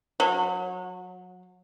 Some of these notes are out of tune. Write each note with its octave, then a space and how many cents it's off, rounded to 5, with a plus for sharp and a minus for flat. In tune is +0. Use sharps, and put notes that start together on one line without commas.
F#3 -25